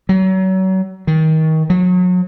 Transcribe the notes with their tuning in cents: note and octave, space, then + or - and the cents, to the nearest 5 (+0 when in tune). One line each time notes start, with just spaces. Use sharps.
F#3 +35
D#3 +25
F#3 -35